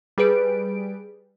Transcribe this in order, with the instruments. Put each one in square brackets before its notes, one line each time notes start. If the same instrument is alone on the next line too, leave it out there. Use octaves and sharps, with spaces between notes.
[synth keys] G3 G#4 B4 D7